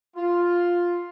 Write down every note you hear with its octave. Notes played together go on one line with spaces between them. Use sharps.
F4